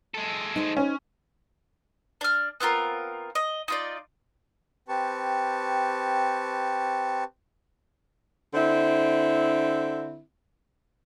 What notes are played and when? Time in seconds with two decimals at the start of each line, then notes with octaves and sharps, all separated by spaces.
0.14 G#3 A4
0.56 D#4 C5
0.77 C#4
2.21 D4 F6
2.60 B3 C4 F4 A#4
3.35 D#5
3.68 D#4 F4 D5
4.88 C4 G4 B4 A5 C#6
8.52 D3 C4 E4